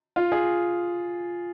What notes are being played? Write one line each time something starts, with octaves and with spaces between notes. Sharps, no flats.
F4
G#4